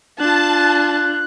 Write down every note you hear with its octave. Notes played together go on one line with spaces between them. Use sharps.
D4 F4 A5 F#6